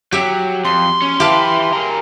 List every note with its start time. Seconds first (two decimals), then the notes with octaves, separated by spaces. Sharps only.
0.12 F#3 G4 E5
0.65 F2 C6
1.02 C#4
1.20 E4 G4 B4 F5 A5
1.73 G#4 A#4